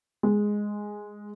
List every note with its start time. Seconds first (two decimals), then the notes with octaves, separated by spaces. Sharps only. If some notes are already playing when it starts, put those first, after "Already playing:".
0.23 G#3